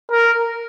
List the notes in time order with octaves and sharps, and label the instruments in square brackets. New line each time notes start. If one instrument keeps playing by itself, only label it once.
[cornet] A#4